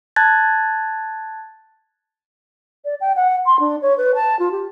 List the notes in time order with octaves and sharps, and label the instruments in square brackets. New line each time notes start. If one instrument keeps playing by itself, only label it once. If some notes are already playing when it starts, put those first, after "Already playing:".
[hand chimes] A5 F#6 G#6 A6
[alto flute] D5
G5
F#5
C6
D4
C#5
B4
A5
F4
G4